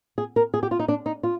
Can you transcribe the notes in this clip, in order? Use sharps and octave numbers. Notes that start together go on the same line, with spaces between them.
G#4
A#4
G#4
G4
F4
D#4
D4
D#4
F4